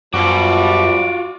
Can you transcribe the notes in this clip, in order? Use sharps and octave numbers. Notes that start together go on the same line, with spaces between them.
F#2 B2 F3 G3 F4 F#4 D6